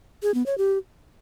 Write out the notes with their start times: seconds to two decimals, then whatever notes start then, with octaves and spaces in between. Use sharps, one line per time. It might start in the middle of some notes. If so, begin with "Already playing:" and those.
0.23 G#4
0.34 B3
0.46 C#5
0.58 G4